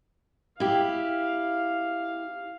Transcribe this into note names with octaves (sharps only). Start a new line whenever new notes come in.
E4 G4 F5